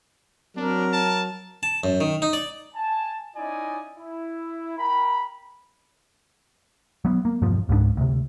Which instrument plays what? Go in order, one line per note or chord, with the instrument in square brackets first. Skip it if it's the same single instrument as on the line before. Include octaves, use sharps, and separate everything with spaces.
[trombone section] F#3 [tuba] C4 [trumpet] D4 [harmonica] A#4
[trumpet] A5
[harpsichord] A5
F#2
D#3
D#4
D5
[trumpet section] G#5 A5
C#4 D#4 E4 D5 D#5 G#5
E4
A#4 G5 A#5 B5
[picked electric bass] F#3 B3
A#3
E1 G2 B2 F3
C#2 G#2 F#3 D4
D2 C3